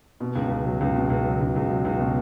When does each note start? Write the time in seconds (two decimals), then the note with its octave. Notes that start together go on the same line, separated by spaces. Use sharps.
0.20 B2
0.36 C#2
0.50 C#2
0.65 F#3
0.81 C#2
0.96 B2
1.10 C#2
1.25 F#3
1.41 C#2
1.56 C#2
1.70 F#3
1.85 C#2
2.00 B2